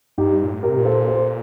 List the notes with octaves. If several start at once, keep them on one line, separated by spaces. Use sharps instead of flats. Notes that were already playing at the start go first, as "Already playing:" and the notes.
G2 D#4 G4
A#2
A2
G4 A#4
C3
A#2
A4 C5
A4 C5